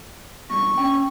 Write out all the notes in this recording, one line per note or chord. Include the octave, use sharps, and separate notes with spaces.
E2 G2 B2 C#6
C#4 G5